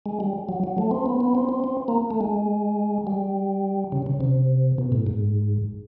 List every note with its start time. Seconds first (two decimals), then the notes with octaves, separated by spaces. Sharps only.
0.06 G#3
0.20 G3
0.49 F#3
0.64 F#3
0.78 A3
0.91 C4
1.06 B3
1.20 B3
1.35 C4
1.49 C4
1.64 C4
1.88 A#3
2.11 A3
2.21 G#3
3.07 G3
3.92 C#3
4.06 C#3
4.21 C3
4.78 B2
4.92 A2
5.07 G#2